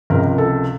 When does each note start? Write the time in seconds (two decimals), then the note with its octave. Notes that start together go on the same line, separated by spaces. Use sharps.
0.10 C#2 C3 F3 A#4
0.38 A4